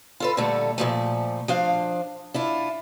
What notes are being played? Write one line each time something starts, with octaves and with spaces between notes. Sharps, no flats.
F4 A4 B4
A#2 D3 G3 A3 A4
A#2 F3 A3
F3 D4 F5
D4 E4 F4